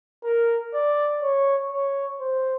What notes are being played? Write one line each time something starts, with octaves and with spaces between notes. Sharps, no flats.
A#4
D5
C#5
C#5
C5